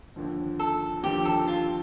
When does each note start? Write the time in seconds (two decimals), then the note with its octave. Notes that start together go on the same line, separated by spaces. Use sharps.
0.16 D#2 D3 F3
0.59 A4
1.03 D#2 D3 F3 G4
1.25 A4
1.47 F4